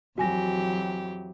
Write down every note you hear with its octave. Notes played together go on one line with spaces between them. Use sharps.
F2 E3 F#3 F#4 G4 G#5 A#6